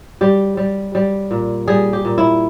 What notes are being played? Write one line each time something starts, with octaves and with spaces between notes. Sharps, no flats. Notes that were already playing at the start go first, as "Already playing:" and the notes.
G3 G4
G3
G3
A#2
G3 G#4
G4
A#2
E4